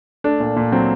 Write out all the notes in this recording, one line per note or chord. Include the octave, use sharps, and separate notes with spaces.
A3 D4
A#2
A#2
F#3 C4